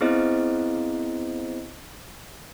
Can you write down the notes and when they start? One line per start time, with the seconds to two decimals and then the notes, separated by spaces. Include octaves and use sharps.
0.01 B3 C4 E4 G#4 C5 D#5